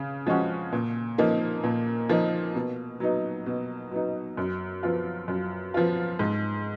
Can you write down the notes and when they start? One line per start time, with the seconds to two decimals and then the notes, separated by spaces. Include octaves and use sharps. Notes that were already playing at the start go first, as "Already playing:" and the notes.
Already playing: C#3
0.27 F3 G#3 C#4 F#4
0.72 A#2
1.18 F3 A#3 D#4
1.64 A#2
2.09 F3 A#3 D#4
2.55 B2
3.00 F#3 B3 D#4
3.46 B2
3.91 F#3 B3 D#4
4.37 F#2
4.83 F3 B3 F4
5.28 F#2
5.74 F3 B3 F4
6.19 G#2